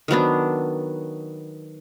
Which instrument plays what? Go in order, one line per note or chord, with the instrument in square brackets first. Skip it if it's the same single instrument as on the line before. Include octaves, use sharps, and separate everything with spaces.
[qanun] D#3 F#3 B3 D4